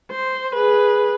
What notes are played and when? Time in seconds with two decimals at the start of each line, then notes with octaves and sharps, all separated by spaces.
0.11 C5
0.54 G#4 B4